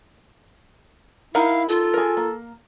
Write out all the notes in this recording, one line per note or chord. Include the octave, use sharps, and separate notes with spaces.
D#4 E4 A#4 F5 F#5
F4 A4
G#4 A#4
A#3